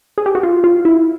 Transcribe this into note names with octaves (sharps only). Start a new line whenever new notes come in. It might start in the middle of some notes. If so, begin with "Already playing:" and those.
G#4
G4
F#4
F4
F4
E4